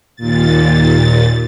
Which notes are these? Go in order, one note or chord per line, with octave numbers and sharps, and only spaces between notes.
D#2 A#2 A6